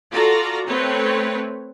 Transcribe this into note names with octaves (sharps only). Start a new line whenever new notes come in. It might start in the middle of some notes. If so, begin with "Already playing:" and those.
F4 F#4 A4 D5 A#5
A3 C4 B4 C#5